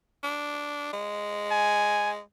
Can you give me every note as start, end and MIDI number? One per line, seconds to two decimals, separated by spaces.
0.23 0.91 62
0.93 2.20 56
1.51 2.10 80